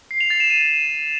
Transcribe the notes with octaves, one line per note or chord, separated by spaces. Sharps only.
C7
F7
A6
E7
D#7